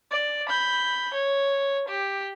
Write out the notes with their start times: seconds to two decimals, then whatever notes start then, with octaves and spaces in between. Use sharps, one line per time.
0.11 D5
0.49 B5 G6
1.14 C#5
1.89 G4